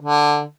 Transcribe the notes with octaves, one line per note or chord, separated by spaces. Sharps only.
D3